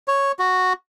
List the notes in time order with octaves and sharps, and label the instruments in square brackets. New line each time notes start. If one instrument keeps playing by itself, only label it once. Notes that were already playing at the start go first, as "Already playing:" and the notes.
[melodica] C#5
F#4